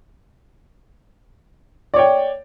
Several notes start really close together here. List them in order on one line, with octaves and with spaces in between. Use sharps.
D5 C#5 G5